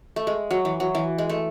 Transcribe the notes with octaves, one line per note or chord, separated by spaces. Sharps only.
A3
G#3
F#3
E3
F#3
E3
G#3
A3